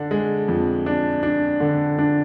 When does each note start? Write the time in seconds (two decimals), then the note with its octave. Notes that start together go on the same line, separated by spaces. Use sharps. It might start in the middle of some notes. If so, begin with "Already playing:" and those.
Already playing: D3 D4
0.11 G#3
0.48 F2
0.86 D4
1.23 D4
1.60 D3
1.99 D4